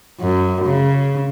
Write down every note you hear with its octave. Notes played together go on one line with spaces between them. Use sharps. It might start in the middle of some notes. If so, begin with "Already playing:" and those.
F#2
C#3